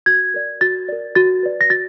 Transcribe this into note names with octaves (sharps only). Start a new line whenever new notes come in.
F#4 G#6
A#4 D5
F#4 A6
A#4 D5
F#4 A6
B4 D5
A#6
F#4 A6